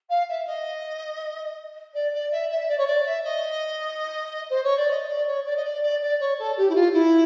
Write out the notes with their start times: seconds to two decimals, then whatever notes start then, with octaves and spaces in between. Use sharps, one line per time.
0.09 F5
0.28 E5
0.46 D#5
1.94 D5
2.13 D5
2.31 E5
2.50 E5
2.68 D5
2.77 C#5
2.87 D5
3.05 E5
3.23 D#5
4.50 C5
4.63 C#5
4.76 D5
4.90 D#5
5.08 D5
5.27 C#5
5.45 D5
5.56 D#5
5.64 D5
5.82 D5
6.01 D5
6.20 C#5
6.38 A4
6.57 G4
6.69 E4
6.75 F4
6.93 E4